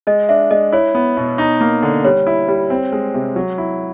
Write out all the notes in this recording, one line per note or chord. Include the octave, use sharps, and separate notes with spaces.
G#3 D#5
D4 E5
G#3 D#5
E4 C#5
B3
B2
D#4
A#3
D3
G3 C#5
E4
G3
C4
G#3
C3
F#3
E4